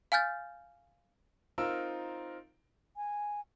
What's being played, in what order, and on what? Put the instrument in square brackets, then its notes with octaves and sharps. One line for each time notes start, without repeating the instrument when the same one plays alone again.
[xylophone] F5 G#5 F6 G6 A6
[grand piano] C4 D#4 F4 A#4 E6
[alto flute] G#5